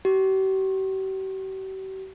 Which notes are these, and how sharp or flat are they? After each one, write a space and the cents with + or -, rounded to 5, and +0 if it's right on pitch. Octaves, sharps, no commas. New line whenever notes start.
G4 -45